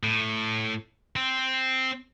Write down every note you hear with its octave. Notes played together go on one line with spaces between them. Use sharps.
A2
C4